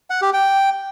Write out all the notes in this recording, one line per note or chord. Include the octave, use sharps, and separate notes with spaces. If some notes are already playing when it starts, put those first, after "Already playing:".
F#5
G4
G5